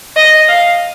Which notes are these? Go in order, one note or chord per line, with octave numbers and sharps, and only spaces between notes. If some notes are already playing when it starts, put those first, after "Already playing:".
D#5
F5